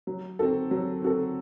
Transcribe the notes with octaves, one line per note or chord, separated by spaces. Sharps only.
F#3
C4 F#4 A4
F#3
C4 F#4 A4